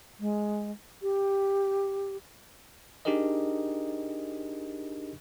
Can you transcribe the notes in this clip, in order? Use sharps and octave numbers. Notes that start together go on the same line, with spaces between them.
G#3
G4
D4 D#4 G4 G#4 A#4 D#5